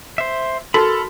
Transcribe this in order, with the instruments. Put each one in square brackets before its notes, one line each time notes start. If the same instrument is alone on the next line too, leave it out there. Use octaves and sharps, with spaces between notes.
[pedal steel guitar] C5 E5
[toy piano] D#4 F#4 A#4 [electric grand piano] A4 [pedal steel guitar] B5 F6